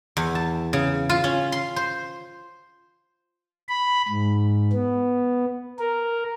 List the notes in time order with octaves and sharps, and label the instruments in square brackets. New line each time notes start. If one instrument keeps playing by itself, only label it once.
[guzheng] E2
A5
C#3
F4
C#4
C6
C5
[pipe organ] B5
G#2
B3
A#4